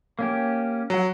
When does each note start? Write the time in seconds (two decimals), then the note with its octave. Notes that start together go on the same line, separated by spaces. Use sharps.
0.19 A#3 C#4 G4
0.90 F#3 F#5